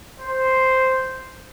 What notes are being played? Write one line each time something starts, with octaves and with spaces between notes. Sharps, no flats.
C5